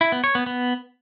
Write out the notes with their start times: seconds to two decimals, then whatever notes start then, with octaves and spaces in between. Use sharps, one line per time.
0.01 E4
0.12 B3
0.24 C#5
0.35 B3
0.46 B3